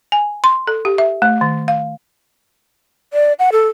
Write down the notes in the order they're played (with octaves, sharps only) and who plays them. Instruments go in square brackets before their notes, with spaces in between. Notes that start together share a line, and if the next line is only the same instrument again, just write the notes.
[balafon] G#5
C6
A4
G4
E5
A3
D#3
F5
[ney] D5
F#5
A4